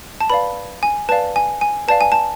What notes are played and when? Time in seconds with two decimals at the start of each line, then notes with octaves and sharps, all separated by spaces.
0.20 A5
0.30 B4 D5 F5 B5
0.83 G#5
1.09 B4 D5 F5 A5
1.36 G#5
1.61 G#5
1.88 B4 D5 F5 A5
2.01 G#5
2.12 A5